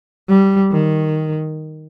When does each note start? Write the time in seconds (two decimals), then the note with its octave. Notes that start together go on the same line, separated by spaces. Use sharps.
0.29 G3
0.72 D#3